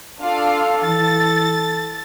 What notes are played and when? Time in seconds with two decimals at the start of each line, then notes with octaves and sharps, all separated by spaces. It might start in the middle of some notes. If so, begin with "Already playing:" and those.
0.21 D4 F4 A4 F5
0.84 E3 A6